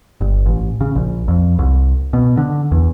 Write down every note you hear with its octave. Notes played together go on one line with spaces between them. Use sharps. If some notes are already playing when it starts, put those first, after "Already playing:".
G1
A1
C#3
A#1
F2
C2
B2
D3
E2